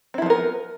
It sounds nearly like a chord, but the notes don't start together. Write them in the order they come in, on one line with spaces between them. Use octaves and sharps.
C4 E4 F3 B3 A#4